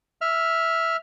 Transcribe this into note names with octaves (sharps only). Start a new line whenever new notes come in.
E5 F6